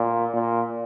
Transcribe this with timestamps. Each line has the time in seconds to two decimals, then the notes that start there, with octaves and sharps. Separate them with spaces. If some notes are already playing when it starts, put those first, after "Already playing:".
Already playing: A#2
0.34 A#2